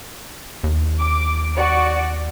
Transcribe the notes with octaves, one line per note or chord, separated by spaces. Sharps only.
D#2
D6
F#4 D5 C#7